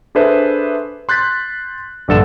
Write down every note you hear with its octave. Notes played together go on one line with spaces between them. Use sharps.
D4 G#4 A4 B4 C5 E5
C6 F#6 G6 A6 B6
A#1 G2 D3 A4 F#5 E7